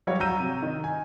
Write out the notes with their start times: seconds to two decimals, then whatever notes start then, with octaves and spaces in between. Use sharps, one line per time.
0.07 F#3 G3 F#4 C#5 F5
0.20 F#3 A#5 E6 G6 D#7
0.40 C3
0.62 D#3
0.84 G#5